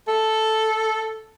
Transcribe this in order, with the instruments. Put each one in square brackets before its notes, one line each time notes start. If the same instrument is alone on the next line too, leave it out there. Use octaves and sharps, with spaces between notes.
[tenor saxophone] A4